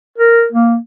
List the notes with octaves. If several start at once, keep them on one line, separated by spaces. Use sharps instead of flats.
A#4
A#3